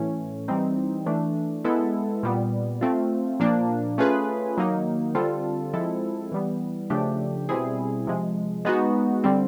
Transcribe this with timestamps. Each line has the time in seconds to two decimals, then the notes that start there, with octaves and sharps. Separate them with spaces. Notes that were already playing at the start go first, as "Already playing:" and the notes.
Already playing: A2 E3 A3 C#4
0.48 E3 G3 C4 D#4
1.06 E3 A3 D4
1.64 G#3 B3 E4 A4
2.23 A#2 G3 B3
2.81 A3 C4 F4
3.40 A#2 F3 A#3 D4
3.98 A3 C#4 F4 G#4 B4
4.57 D#3 F#3 A#3 D#4
5.15 D3 G3 C4 F4 A4
5.73 F3 G#3 C4 E4 A4
6.32 E3 G3 B3
6.90 C#3 F3 A3 D4 G4
7.49 B2 G3 C4 E4 G#4
8.07 C3 F3 G#3
8.65 G#3 B3 D#4 F#4
9.24 D3 G3 C4